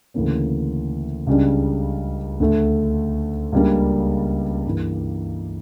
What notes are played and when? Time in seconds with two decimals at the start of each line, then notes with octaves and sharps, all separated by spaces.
0.14 D2 C#3 E3 A#3 C#4
1.27 C#2 C#3 G3 D4
2.40 D2 D3 A3
3.52 C#2 C#3 G3 A#3 D4
4.66 G2 E3 A#3